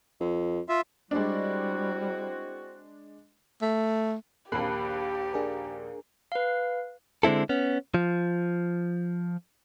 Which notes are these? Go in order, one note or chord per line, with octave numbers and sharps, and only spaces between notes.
F2
F4 E5
G3 G#3 C4 D4 E4 F#4
A3
A#1 D#2 A#3 G4 A5 B5 F#6 C7
D4 G#4 A#4
B4 F5
D3 G#3 C4 E4 A4
B3 C#4
F3